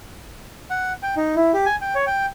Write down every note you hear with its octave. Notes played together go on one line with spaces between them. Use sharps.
F#5
G5
D#4
E4
G4
G#5
G5
C#5
G5